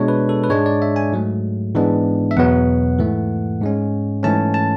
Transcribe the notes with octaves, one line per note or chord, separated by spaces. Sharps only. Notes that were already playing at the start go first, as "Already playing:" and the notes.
Already playing: B2 G#3 D4 C#5
B4
A4
B4
G#2 G#3 D4 C#5
D5
E5
G#5
G#2 F#3 A3
G#2 E3 G#3 B3 D4
E5
E2 B2 F#3 B3 F#5
G#2 E3 A3
G#2 G#3 C#4
G#2 E3 A3 C#4 A5
A5